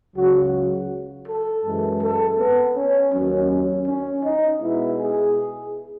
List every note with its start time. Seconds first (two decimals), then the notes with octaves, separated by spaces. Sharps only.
0.15 C#2 C#3 F#3 F#4
1.27 A4
1.63 F#2 E3 G#3
2.01 A4
2.38 B3
2.75 C#4
3.12 D#2 D#3 F#3 C#4
3.49 C#4
3.86 C#4
4.23 D#4
4.60 B2 G#3 B3 E4
4.98 G#4